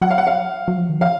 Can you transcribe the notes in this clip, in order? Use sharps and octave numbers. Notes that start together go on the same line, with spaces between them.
F#3 F#5
F5
F#5
F5
F#3
F3
D#3
F3 F5